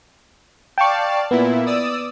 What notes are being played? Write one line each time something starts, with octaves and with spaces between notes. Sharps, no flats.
D5 F5 G5 A5 C#6
A#2 B3 E4
D5 D#6 E6